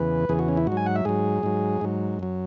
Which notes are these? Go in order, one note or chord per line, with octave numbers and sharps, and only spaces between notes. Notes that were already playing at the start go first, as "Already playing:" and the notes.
Already playing: E2 C#3 E3 B4
E2 C#3 E3 G#4
F#4
C#4
E4
G#2 F#3 F#4
G#5
F#5
E5
G#2 F#3 G#4
G#2 F#3
G#2 F#3
F#2 F#3